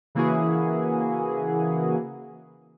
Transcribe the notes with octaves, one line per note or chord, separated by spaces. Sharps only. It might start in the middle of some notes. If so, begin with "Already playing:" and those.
C#3 E3 A#3 E4 F#4 G#4